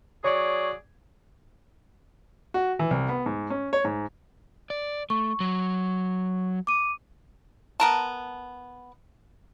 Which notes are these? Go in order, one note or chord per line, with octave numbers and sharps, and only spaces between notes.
F#3 G#4 C#5 D5 C#6
F#4
E3
C2
B3
G#2
C#4
C#5
G#2
D5
A3 C#6
F#3
D6 D#7
B3 A#4 A5